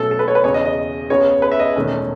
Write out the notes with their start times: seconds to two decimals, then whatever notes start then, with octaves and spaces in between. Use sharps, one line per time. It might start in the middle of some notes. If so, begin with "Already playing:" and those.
Already playing: B1 B2 A3 C#4 A4
0.11 A4
0.19 B4
0.28 C#5
0.35 B4
0.44 E2 C#3 G#3 C#5
0.54 D#5
0.65 D#5
1.10 C#2 C#3 G#3 B3 C#5
1.42 B4
1.52 E5
1.59 D#5
1.76 E1 E2 D#3 A3 C#4